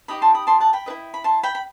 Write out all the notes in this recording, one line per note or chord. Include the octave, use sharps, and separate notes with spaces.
D#4 G4 D#5 B5 D#6
A5 C6
B5 D#6
A5 C6
F#5 A5
G5 B5
E4 B4 D#5
B5
A5 C6
G5 B5
B5